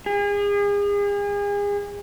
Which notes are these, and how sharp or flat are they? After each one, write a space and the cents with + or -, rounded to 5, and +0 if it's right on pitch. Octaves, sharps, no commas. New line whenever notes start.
G#4 -35